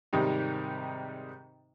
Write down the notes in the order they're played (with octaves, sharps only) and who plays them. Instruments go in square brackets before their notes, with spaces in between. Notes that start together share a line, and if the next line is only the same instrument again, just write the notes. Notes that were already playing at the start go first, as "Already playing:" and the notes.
[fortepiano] G#2 C3 D#3 G3 D#4